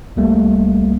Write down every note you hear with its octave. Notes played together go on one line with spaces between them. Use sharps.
C2 G3 A3 A#3